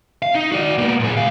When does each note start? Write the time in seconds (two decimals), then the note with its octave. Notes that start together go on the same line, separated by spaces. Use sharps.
0.22 F5
0.35 D#4
0.52 F#4 D5
0.78 A#3 B3
1.00 A#2 G#4
1.16 C#2 F5